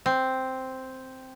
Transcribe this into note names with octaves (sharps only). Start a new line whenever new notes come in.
C4